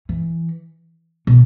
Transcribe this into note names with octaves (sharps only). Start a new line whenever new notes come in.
E3
B2